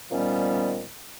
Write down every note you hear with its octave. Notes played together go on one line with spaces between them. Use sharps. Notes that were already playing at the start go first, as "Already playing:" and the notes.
A#2 D#3 F3 G3 B3 C#4